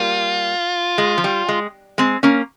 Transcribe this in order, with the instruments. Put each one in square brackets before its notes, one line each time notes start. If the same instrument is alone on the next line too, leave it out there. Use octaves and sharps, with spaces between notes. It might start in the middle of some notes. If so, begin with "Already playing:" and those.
Already playing: [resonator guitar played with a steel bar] G3 A#3 [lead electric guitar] F4
[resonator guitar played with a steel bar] G#3
F3
G3
G#3
G#3 C4
A#3 C#4